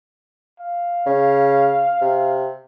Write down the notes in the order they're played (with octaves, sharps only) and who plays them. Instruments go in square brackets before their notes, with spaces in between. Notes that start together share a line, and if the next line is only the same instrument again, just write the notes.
[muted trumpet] F5
[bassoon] C#3
C3